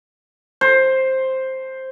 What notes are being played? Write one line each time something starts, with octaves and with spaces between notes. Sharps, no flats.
C5